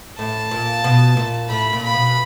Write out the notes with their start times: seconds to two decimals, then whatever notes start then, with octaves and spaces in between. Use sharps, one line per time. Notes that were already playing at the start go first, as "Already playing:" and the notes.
0.19 A2 A5
0.51 A#2
0.84 B2
1.17 A#2
1.50 A2 B5
1.73 A#2
1.83 B5
1.93 B2